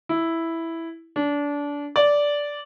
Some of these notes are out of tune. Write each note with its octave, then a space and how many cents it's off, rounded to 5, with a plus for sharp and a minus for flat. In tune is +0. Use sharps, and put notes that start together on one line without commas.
E4 +0
D4 -25
D5 -10